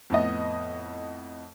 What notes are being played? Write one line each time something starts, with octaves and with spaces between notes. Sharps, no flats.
F2 A2 B3 D#5